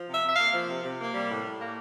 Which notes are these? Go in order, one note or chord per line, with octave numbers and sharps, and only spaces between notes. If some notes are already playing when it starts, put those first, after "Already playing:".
Already playing: F3
C3 E5
C3 E5
A#3 F5
F3
C3
C3
A#3
G3
A2
A2
A#3